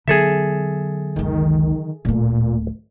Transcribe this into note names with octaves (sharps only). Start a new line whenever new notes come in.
D3 F#3 B3 D#4 G#4 A4 E5
F#1 C#2 D#3
D1 A#2 A3